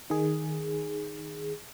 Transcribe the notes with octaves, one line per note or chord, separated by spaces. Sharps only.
D#3 G#4